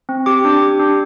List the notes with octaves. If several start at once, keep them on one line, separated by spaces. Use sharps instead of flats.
C4
G4 D6
D4
G4
D4